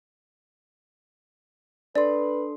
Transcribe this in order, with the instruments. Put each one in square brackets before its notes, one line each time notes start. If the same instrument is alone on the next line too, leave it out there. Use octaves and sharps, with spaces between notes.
[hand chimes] D4 A4 C6 [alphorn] B4 [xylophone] D5